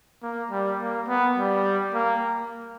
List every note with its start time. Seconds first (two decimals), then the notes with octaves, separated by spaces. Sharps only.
0.23 A#3
0.51 G3
0.80 A#3
1.08 B3
1.37 G3
1.94 A#3